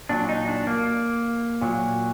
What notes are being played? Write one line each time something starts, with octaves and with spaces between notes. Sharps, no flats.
A#2 F#3 D4
D#4
D4
A#3
A#2 F#3